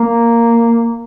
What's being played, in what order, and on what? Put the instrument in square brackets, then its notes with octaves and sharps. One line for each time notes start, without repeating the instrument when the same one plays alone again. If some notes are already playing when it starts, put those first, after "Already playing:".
Already playing: [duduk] A#3